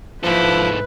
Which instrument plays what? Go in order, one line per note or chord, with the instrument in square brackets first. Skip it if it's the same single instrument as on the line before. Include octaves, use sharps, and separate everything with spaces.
[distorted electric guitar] G#2 A4 [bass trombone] F3 [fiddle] E4 [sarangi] B4